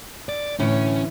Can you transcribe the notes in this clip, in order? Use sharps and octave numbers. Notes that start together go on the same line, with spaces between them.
D5
A2 D3 E3 C#4